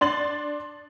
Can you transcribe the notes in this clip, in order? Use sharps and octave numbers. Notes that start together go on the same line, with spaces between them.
D4 C6 A6 F#7